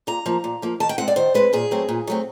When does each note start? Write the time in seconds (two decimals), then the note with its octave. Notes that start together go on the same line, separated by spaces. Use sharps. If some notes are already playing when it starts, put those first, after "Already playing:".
0.07 A#2 A#5
0.26 F3 A#3
0.44 A#2
0.62 F3 A#3
0.80 D#3 A5
0.89 G5
0.98 G#3 C4 F#5
1.08 D5
1.16 D#3 C5
1.34 G#3 C4 B4
1.53 A#2 G#4
1.71 F#3 A3 C4
1.89 A#2
2.07 F#3 A3 C4